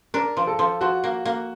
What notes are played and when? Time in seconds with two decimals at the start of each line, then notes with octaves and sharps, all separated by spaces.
0.14 D4 A#4
0.37 F3
0.47 A4
0.59 F3
0.81 F3 F#4
1.04 A#3
1.25 A#3